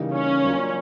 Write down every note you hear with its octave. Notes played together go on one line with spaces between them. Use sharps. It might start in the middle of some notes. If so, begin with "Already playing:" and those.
Already playing: C#3 E3 G3 A#3 D#4
C#4
F#3 A#3 D4 F4